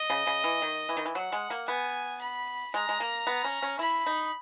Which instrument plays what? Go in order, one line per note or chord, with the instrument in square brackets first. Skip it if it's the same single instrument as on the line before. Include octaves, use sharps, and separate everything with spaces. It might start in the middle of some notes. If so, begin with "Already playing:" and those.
Already playing: [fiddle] D#5
[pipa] C#3
C#3
E3
D#3
E3
D#3
E3
[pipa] F#3 [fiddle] F#5
[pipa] G#3
A#3
[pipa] B3 [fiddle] G#5
[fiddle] B5
[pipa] G#3 [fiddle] A#5
[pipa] G#3
A#3
B3
C#4
C#4
[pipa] E4 [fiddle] B5
[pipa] D#4